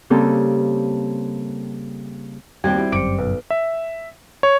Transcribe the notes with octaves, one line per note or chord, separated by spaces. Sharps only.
C#3 G3 A#3 C4 A4
D#2 G3 C4 F#4 G5 G#6
E4
G1 F#2 C5 D6 C#7 D7
B1 B4
E5
C#5